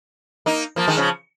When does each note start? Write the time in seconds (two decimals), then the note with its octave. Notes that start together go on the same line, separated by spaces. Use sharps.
0.46 A#3 D#4
0.76 F3 A#3
0.88 D#3 G#3
0.97 C#3 F3